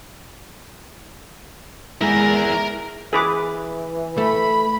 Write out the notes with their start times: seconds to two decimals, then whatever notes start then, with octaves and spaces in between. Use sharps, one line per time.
2.01 G#3 E4 G#4 A#4 A#5
3.13 E3 G#4 B4 D6
4.18 A3 B5